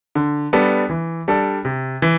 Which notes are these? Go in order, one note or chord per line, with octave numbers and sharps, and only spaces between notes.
D3
G3 B3 D4 A4
E3
G3 D4 A4 D5
C3
E3